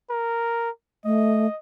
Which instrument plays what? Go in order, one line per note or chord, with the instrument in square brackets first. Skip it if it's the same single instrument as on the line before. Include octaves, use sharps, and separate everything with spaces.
[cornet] A#4
[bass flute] A3 [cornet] D#5